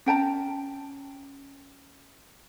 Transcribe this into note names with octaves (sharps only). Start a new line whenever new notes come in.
C#4 G5 A5 A#5